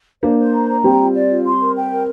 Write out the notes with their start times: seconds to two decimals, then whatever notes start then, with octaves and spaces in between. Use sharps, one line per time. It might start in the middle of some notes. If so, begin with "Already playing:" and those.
0.22 A#3 D4 C5
0.39 C5
0.53 A#5
0.69 A#5
0.84 G3 C4 G5
1.00 F4
1.14 D5
1.30 F4
1.45 C6
1.61 A#4
1.76 G5
1.91 A#4